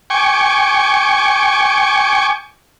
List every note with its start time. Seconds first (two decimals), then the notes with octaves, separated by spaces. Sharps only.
0.10 G5 G#5 C#6 D6